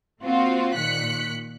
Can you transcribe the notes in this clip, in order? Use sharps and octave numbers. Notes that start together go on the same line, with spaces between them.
A#3 C4 F4 F#4
A#2 D#3 F#6 B6 C#7